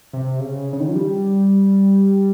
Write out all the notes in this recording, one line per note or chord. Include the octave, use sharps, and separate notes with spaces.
C3
C#3
C#3
D#3
F3
G3